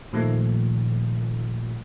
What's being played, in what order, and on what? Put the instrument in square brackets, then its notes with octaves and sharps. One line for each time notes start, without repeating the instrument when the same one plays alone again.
[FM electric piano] A#2 D#3 F3 A3